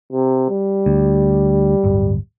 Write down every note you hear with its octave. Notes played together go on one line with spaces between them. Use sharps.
C3
G3
D2
D1 G1